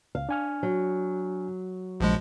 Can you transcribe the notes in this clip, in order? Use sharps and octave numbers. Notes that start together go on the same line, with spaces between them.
C#2 F5
D4 G#5 F6
F#3
A#1 G2 A#2 F3 G#3